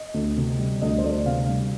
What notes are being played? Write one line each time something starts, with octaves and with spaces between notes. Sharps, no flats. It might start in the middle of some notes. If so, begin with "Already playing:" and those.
Already playing: D#5
D2
C3
G3
D2 D#5
C5
D2 D5
C3 F5
G3